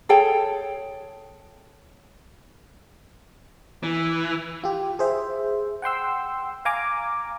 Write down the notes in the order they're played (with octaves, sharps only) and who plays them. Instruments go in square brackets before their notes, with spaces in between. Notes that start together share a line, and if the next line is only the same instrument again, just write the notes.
[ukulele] G#4 A4 C#5 G5
[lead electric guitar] E3
[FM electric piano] F4 G4
G#4 C5 E5
F#5 G5 C6 E6
F5 G#5 A#5 D6